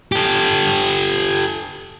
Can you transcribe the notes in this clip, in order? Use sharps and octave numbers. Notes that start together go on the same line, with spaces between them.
G4 A4